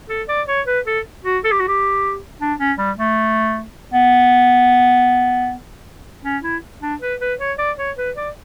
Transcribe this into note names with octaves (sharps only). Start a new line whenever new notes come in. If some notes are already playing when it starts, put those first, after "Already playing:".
A4
D5
C#5
B4
A4
F#4
A4
G4
F#4
G4
D4
C#4
G3
A3
B3
C#4
E4
D4
B4
B4
C#5
D5
C#5
B4
D5